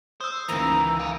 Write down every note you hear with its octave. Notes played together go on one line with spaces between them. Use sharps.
C5 D#6 E6
C#2 D#3 E3 A#3 A#5
F5 G#5